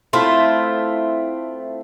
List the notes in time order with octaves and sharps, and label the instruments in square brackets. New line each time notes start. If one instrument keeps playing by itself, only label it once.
[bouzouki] A3 C4 E4 F4